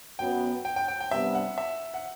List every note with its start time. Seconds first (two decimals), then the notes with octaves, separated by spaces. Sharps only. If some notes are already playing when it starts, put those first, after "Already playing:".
0.19 F#2 F#3 B3 G5
0.65 G5
0.76 G5
0.88 G5
1.00 G5
1.11 C3 G3 B3 D4 E5
1.35 F#5
1.58 E5
1.94 F#5